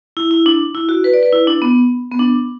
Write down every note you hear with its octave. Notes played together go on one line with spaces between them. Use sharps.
E4
E4
D4
E4
F#4
B4
D5
B4
E4
D4
B3
B3
D4